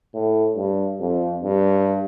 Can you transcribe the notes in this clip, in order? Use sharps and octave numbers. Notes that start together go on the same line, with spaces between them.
A2
G2
F2
G2